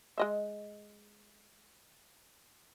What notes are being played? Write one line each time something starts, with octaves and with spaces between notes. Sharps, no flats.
G#3 D#5 E5